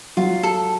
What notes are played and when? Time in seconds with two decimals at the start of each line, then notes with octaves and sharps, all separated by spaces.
0.17 F#3 F4 F#4
0.43 A4